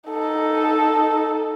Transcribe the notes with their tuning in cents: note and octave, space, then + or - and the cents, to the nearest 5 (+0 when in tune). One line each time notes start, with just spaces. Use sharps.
D#4 +0 A4 +0